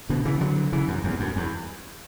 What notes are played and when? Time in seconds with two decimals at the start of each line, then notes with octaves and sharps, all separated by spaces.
0.09 B2 D3
0.25 C#3 E3
0.41 D3 F#3
0.73 C#3 E3
0.88 F#2
1.04 E2
1.20 F#2
1.36 E2